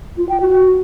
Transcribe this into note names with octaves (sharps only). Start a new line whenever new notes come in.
F4
G5
F#4